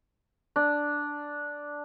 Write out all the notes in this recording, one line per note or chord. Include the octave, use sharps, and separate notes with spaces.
D4